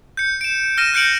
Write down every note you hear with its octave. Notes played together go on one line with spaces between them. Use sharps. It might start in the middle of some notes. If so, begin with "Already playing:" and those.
G6 C#7
D7 E7
F6 A#6 D#7 E7
F#6 G6 C#7 D7 F#7